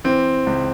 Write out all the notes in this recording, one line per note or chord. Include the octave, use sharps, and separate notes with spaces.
E3 C4
C#2